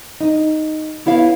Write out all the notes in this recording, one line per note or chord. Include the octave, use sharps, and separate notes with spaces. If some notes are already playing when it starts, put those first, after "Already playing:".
D#4
B3 E4 C#5 F5